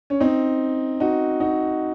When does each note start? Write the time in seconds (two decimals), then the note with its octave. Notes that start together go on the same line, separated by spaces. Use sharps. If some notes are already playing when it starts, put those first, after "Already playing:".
0.10 C#4
0.20 C4 D#4
1.00 D#4 F#4
1.40 D#4 F#4